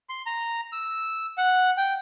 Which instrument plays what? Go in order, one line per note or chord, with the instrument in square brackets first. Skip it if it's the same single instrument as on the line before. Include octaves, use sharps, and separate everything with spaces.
[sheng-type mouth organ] C6
A#5
E6
F#5
G5